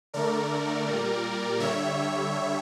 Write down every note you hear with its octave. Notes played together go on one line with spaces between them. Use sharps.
D3 A3 A#4 D5
A#2 G3
D3 G3 C#5 E5